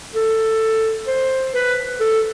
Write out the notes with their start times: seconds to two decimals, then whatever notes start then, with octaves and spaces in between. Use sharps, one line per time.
0.15 A4
1.07 C5
1.54 B4
2.00 A4